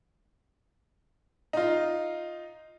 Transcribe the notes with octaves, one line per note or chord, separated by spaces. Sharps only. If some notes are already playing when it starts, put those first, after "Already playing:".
D#4 F4